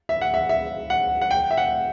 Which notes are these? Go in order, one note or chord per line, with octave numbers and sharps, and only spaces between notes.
E5
F#5
E5
E5
F#5
F#5
G5
E5
F#5